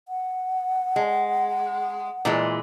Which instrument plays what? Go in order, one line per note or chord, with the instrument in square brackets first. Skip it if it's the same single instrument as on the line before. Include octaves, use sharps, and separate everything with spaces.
[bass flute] F#5
[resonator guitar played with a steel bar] G#3
A#2 E3 G#3